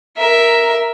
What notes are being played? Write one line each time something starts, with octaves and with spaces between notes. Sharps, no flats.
A#4 E5